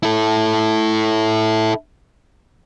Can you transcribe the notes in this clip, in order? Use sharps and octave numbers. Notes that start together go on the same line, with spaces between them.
E4 A4